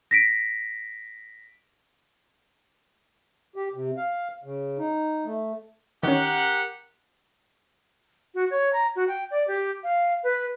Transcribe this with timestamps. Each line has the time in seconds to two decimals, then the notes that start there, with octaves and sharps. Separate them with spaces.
0.11 A#6 B6 D7
3.56 G4
3.74 C3
3.97 F5
4.44 C#3
4.78 D#4
5.25 A3
6.03 D#3 C#4 G4 A#4 F#5
8.35 F#4
8.51 C#5
8.73 A#5
8.96 F#4
9.08 G5
9.31 D5
9.48 G4
9.83 F5
10.23 B4